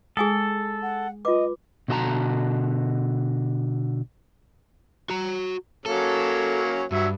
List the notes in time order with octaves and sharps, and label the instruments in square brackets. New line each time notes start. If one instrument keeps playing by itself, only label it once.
[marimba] G#3 [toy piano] G#4 G#5 D#6 [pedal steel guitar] A4
[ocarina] F#5
[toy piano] F4 D6 [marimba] B4 [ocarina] D#5
[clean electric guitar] B2 D3 F#4 D#5 A5 A#5
[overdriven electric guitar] F#4 A#5
[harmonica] F#3 A#3 C#4 [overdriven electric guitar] A4
[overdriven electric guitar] G2 [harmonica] F#3 E5